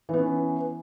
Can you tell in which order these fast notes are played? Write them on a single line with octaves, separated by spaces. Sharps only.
E3 B3 C#4